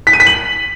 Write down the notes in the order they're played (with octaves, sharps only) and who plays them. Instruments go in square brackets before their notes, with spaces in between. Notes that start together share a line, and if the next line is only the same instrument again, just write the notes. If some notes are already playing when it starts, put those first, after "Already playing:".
[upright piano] B6
D#7
B6
F#7